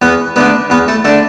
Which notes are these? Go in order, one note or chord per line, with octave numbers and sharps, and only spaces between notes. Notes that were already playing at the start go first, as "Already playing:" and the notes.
E2 B3 B4
D3 A3 B3 D4 B4
E2 B3 B4
A3 A4
D3 A3 D4 A4